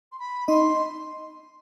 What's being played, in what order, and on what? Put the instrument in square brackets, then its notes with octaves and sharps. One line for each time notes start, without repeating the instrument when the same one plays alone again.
[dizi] C6
B5
[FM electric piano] D#4 D#5 [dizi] C6